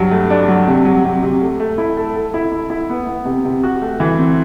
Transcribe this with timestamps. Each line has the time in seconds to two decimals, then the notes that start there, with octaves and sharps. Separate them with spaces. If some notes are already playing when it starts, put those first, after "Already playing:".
Already playing: G2 F#3
0.11 A3
0.30 D4
0.48 F#3
0.68 C3
0.85 F#3
1.05 C3
1.23 C3
1.41 A3
1.60 A3
1.78 E4
1.97 A4
2.15 A4
2.34 E4
2.52 E4
2.70 E4
2.90 B3
3.07 B3
3.25 C3
3.45 C3
3.63 F#4
3.82 A3
4.00 E3
4.19 C4